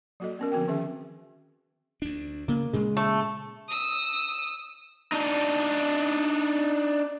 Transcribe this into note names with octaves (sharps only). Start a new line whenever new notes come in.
F#3 A#3 F#4 A4 D#5
B3 C#4 A#4
D3 F3 C4 F#4 A#4 G5
D#3 C#4 G#4 E5
D2 D4
C#3 A#3
A#2 C#3 G#3
A3
D#6 E6
D4 D#4